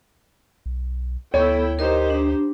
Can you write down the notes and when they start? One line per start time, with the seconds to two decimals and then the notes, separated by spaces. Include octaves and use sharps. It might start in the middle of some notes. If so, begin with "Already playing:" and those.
0.66 B1
1.34 D2 B3 E4 A4 C#5 G5
1.79 D#4 G4 A#4 C5 D#5
2.10 D4